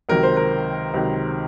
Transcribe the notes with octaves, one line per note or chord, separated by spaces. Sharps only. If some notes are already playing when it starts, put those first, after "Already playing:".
C#2 C3 D#3 F#3 A#4
C5
A#4
C#2 C3 D#3 F#3